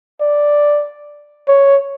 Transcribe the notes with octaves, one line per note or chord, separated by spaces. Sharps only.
D5
C#5